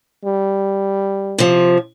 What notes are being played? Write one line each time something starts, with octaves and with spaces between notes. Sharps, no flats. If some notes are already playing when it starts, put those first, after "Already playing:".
G3
C3 F3